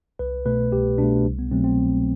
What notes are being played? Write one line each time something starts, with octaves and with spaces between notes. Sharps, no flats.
C2 B4
B2 A3 B4
C2 G4
B2 D4
A3
C2
B3
B2 F#3 A3 C4
C4
C2